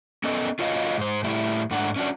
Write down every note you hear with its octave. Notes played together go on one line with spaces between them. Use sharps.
B3 C#4 A4 D#5
F4 F#4 C#5 D#5 F5
G#2 C5
A2 G3 E4
G#2 A3 D4 F#5
C#4 D4 F#4